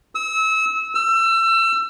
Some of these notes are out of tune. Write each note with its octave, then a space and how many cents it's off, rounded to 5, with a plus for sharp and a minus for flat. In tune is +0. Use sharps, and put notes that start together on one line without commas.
E6 -30
E6 +30